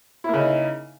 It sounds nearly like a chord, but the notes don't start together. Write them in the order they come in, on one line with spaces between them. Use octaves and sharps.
E4 A#3 C#3 D#4